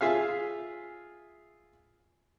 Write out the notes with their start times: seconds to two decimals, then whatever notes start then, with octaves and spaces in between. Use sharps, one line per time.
0.01 F4 G#4 E5 F5